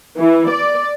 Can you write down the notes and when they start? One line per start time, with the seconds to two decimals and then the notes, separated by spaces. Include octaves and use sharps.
0.17 E3
0.50 D5